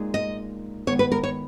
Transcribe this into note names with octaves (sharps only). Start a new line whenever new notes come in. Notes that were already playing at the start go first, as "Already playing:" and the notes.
Already playing: A#2 G#3 D#4 G#4
D#5
D#3 G#3 B3 C#5
B4
A#4
C#5